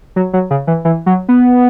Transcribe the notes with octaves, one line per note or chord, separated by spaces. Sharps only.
F#3
F#3
C#3
E3
E3
F#3
B3